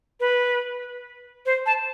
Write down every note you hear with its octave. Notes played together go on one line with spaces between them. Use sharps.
B4
C5
A5